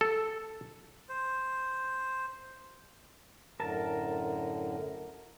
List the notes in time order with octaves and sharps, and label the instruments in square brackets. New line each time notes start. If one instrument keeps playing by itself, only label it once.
[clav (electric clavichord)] A4
[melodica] C5
[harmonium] F#2 A2 D3 [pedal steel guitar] A#4 A5